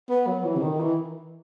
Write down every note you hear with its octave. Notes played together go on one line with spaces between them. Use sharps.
B3
F#3
E3
C3
D#3
E3